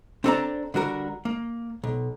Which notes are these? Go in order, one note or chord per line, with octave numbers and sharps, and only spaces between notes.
C4 D4 A4 B4 D5 A#5
D3 G3 F#4 A#4
A#3
B1